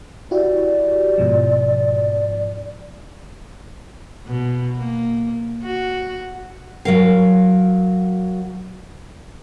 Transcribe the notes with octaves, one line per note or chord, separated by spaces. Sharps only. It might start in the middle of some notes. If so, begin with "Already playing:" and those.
E4 F#4 G4 D5
G#2 B2 F3
B2
A#3
F#4
F#3 A#4 F5